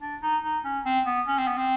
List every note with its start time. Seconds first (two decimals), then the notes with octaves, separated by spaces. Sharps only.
0.01 D4
0.22 D#4
0.43 D#4
0.64 C#4
0.85 C4
1.06 B3
1.27 C#4
1.38 C4
1.47 B3
1.58 C4